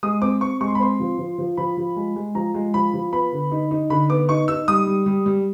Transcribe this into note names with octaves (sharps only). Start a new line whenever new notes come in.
G#3 D#6
C4 D6
C4 C#6
G#3 C#6
C6
B5
C4 C6
F3
F3
F3
F3 B5
F3
G#3
G#3
F3 A#5
G#3
F3 B5
F3
B3 B5
D3
D#4
D#4
D3 B5
B3 D6
D#4 C#6
D#4 E6
G3 D#6
G3
G3
G3